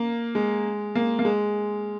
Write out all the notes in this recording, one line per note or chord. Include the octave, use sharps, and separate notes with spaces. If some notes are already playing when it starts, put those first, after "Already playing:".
Already playing: A#3
G#3
A#3
A#3
G#3